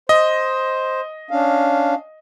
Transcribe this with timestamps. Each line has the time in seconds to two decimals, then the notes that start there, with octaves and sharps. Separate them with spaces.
0.09 C5 D#5
1.31 C#4 D4 F5